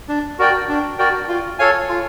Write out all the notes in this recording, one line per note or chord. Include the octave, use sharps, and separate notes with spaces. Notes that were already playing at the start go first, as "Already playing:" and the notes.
D4
F#4 A#4 D5 G5
D4
F#4 A#4 D5 G5
F4
A4 C#5 F5 G#5
F4